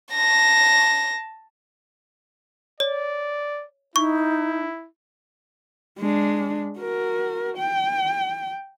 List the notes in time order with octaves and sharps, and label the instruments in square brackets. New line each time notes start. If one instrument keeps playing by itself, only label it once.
[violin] A5 A#6
[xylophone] C#5 [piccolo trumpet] D5
[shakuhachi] D#4 [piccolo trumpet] E4 [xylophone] C#6
[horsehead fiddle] G#3 D4
F#4 A#4
G5